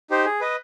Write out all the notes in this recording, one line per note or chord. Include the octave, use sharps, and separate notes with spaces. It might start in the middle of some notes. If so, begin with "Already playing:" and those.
D#4 G4 C5
G#4
B4 D#5